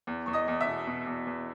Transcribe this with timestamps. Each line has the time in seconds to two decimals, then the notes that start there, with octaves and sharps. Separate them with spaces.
0.07 E2
0.26 E2 C#6
0.33 D#5 D#6
0.48 E2
0.61 E5 E6
0.67 B2
0.87 B2
1.07 E2
1.27 E2